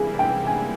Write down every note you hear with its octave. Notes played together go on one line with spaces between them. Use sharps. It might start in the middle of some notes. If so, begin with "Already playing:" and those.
Already playing: C3 E3 G3 A#3 E4 G#4
G5
G#5